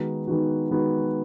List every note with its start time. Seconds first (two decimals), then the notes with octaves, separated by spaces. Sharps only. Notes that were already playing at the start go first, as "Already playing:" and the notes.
Already playing: D#3 G#3 B3 D#4 F#4
0.27 D#3 G#3 B3 D#4 F#4
0.71 D#3 G#3 B3 D#4 F#4